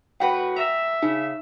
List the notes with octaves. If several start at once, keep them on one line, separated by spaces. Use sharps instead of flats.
A2 F#4 B4 F#5 G5
E5 A#5
C#3 D#4